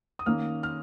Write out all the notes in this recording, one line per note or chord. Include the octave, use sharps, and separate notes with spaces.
D#6
D#3 A#3 C#4 F6
F6